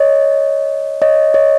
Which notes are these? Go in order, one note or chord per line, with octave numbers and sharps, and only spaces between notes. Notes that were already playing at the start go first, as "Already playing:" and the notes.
Already playing: C#5 D#5
C#5 D#5
C#5 D#5